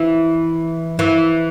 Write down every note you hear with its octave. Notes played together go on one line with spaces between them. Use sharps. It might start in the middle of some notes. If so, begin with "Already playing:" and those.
Already playing: E3
E3